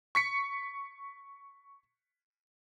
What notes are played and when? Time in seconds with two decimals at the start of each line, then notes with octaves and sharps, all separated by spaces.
0.15 C#6 B6 C#7